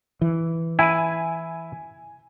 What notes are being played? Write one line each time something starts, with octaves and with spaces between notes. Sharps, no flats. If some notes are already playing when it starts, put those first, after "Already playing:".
E3
E4 G#5 D#7